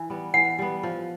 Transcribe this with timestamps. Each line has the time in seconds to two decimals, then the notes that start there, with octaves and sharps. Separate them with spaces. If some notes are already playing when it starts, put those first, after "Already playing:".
Already playing: E3
0.10 G3 B3
0.34 E3 F#5
0.59 G3 B3
0.83 F3